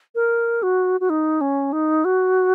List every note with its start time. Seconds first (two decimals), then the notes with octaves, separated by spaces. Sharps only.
0.15 A#4
0.63 F#4
1.00 F#4
1.10 D#4
1.41 C#4
1.72 D#4
2.05 F#4